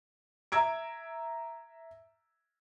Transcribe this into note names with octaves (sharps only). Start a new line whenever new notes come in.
E5 A#5 E6 G#6 D7